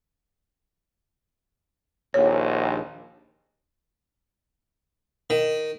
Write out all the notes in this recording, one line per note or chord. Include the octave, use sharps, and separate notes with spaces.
A#1 D#2 C#5
D#3